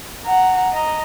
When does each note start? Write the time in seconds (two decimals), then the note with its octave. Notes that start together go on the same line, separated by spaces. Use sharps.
0.25 F#5 A#5
0.73 D#5 A#5